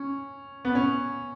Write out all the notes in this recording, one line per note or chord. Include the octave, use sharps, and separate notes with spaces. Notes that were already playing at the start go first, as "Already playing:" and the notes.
Already playing: C#4
B3
C#4